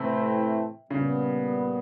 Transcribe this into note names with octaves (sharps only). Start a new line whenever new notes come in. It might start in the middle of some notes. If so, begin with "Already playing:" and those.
Already playing: A2 C3 E3 A3 C4 E4
A#2 C#3 G3 B3